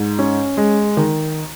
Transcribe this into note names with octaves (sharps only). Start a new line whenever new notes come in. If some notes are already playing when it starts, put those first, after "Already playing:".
Already playing: G#2
C#4
G#3
D#3